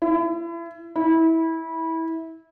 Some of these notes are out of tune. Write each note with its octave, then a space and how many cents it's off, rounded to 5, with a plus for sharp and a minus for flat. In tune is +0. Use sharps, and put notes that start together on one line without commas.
E4 +35
E4 -20